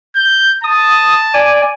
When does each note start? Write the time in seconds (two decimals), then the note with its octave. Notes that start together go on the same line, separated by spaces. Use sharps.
0.15 G6
0.64 A5 D#6
1.34 D5 G#5